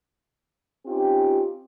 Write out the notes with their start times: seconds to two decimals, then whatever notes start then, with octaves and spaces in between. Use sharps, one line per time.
0.86 C4 C#4 D#4 F4 G4